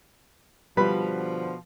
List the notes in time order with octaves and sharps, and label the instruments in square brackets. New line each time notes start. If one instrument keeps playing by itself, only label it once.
[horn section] B2 D3 F3 [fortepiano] G3 B4 B5